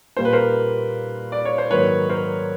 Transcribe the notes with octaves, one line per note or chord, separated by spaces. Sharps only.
A#2 G3 A#3 C5
B4
A#4 C5
D5
C#5
C5
G#2 D#3 F#3 A#3 B4 C#5
A#4 C5